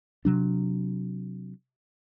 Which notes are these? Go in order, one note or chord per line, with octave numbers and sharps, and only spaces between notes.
C3 F#3 D4